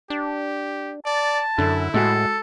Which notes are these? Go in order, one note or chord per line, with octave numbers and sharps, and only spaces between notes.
D4 G4
D5 A5
F#2 D3 E4
A2 G#3 F#4 G#4 A4